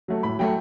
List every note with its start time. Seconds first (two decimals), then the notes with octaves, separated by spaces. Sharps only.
0.08 F#3 A3
0.23 A2 B5
0.39 F#3 A3 G5